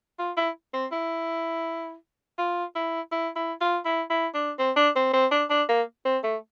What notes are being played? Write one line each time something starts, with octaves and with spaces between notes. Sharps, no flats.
F4
E4
C4
E4
F4
E4
E4
E4
F4
E4
E4
D4
C4
D4
C4
C4
D4
D4
A#3
C4
A3